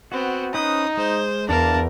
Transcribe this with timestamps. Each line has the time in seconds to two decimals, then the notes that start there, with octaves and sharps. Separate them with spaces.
0.12 B3 C4 F#4
0.54 C#4 D#4 B4 C5 D#6
0.97 G#3 C5
1.49 E2 D4 A#4 D5 F5 A5